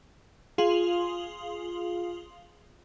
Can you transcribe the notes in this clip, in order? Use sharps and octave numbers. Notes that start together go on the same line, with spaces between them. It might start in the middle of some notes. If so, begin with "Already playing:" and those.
F4 G#4 F5 C6 F7 F#7